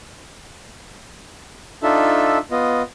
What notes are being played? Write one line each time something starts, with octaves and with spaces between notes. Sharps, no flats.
D4 D#4 F4 A4 E5
B3 F4 D#5